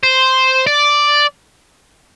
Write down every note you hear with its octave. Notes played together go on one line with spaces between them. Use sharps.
C5
D5